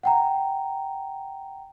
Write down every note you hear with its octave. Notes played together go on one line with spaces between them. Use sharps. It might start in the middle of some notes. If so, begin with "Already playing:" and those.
F#5 G5 A#5